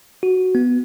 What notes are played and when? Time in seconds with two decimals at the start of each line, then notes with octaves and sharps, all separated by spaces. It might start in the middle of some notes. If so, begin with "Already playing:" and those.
0.23 F#4
0.55 B3